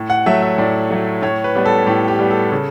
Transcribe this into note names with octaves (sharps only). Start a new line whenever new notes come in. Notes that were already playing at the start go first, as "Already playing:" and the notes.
Already playing: A2
F#5
F#3 A3 E5
E5
A2 D5
F#3 A3
A2 C#5
B4
G3 B3
A4
A2 G4
G4
G3 B3
A4
C#3